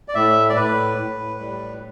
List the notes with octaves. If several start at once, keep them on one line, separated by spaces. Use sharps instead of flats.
D5
A2 E5
D5
A2 B4
A2
G3